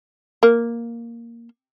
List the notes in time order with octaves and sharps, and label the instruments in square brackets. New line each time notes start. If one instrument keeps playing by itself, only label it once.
[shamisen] A#3